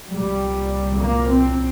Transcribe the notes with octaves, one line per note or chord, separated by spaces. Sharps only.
C2 A#2 G3
A#3
C4